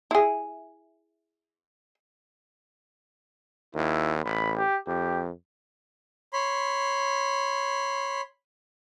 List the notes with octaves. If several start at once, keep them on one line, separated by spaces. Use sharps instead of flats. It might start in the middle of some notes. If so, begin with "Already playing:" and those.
E4 G#4
D#2 E4
A1 B5
G4
F2 G4
C#5 B5 C6